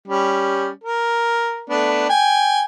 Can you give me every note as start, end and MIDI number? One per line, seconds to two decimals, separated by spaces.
0.08 0.68 55
0.08 0.68 61
0.84 1.63 70
1.70 2.09 57
1.70 2.09 59
1.70 2.09 62
2.09 2.64 79
2.09 2.64 80